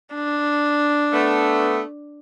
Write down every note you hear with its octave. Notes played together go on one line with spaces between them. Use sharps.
D4
A3 B3